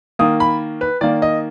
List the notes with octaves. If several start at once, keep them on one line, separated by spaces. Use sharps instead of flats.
D#3 A#3 D#6
B5
B4
D#3 A#3 D5
D#5